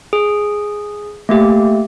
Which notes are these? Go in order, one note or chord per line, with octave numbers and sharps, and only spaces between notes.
G#4
A3 A#3 G4